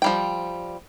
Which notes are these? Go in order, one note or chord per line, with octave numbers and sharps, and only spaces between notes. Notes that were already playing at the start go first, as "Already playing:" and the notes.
F3 G3 G5